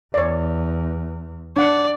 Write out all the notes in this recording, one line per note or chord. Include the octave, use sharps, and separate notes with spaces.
E2 C#5 D5
D4 D5 F#5